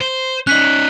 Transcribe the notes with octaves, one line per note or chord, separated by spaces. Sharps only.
C5
C#4 D#4 F#6 B6 F#7